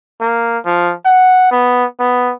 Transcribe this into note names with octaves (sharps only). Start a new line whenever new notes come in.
A#3
F3
F#5
B3
B3